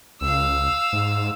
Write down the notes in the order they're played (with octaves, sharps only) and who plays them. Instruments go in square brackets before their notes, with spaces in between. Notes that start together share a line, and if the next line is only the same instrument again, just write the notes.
[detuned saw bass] C#2 [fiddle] F5 E6
[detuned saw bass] G#2